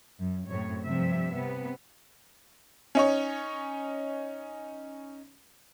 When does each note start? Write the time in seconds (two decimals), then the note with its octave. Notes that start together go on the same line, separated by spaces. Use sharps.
0.19 F#2
0.49 F#2 A2 C3 C#5
0.84 G2 C3 F3 E5
1.33 C3 B3
2.95 C#4 D#4 C#5